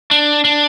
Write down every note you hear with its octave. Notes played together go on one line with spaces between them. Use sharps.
D4
D4